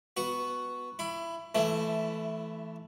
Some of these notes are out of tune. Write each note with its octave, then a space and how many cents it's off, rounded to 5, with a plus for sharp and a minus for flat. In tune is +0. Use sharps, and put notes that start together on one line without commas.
B3 +0 F#4 +0
E4 +25 B5 +10
E3 +0 A3 -10 E4 +30